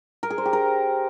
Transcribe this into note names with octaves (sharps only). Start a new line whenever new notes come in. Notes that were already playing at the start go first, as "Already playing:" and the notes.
A#4
G#4
C5
G4
A#4